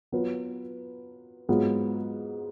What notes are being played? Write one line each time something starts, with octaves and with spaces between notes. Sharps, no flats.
F#3 B3 F4 B4
G#2 F#3 B3 F4